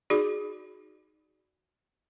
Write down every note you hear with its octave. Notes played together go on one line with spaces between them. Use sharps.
D#4 F#4 G#4 D5